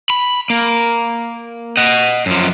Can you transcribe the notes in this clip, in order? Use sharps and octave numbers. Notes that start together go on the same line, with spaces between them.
B5
A#3
D#5 F#5
F#2 F3